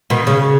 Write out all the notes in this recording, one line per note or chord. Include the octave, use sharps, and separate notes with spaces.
B2 D#3
C#3